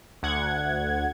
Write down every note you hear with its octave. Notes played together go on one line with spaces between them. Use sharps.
D2 F#5 G#6